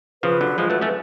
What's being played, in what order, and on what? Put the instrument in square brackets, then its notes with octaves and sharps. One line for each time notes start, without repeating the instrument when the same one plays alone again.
[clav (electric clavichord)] C#3 F3 [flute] B4
[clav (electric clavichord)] D3 F#3
F3 G#3
F#3 A3
A3 C#4